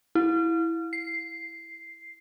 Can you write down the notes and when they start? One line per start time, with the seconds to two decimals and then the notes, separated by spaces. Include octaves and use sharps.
0.15 E4
0.93 C7